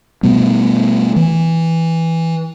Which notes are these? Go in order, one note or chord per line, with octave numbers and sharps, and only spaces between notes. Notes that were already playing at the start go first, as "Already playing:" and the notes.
B2 G3 A3 B3
E3